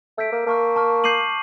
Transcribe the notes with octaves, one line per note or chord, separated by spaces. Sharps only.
A3 E6 G6 B6 D7
A#3
A#3 A5 C#6 F6
A5 C#6 F6
D6 G6 C7 D#7 F#7